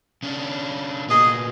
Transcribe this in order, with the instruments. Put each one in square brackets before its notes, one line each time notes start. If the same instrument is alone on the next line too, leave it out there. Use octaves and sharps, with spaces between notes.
[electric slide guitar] C#3 C#4 D4
[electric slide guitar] A#2 B3 [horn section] G#4 D#5